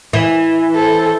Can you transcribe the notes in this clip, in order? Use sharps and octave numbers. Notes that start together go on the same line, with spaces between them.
E3
A4 C5